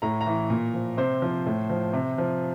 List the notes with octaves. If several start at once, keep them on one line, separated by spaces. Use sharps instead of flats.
A2 A#5
A#5
E3
A#2
F3
C3 C5
F3
A2
F3
C3
F3